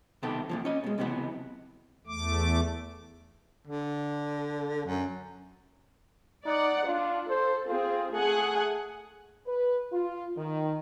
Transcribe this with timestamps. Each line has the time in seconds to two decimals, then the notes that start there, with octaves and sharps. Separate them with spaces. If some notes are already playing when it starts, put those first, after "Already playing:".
0.23 B1 C3 D#3 B3 G4 A4
0.49 E2 A#2 F3
0.65 C#4 D#5
0.84 B2 G#3
0.98 C#2 C3 E3 F#3 B3
2.07 E2 A3 D6
3.67 D3
4.86 F#2
6.45 D#4 D5 F#5
6.86 D4 F4
7.29 A4 C5
7.68 C4 F4 G#4
8.13 A3 G#4 F#5 G#5
9.46 B4
9.92 F4
10.37 D#3